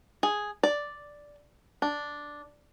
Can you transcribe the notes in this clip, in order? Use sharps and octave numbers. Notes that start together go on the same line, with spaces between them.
G#4
D5
D4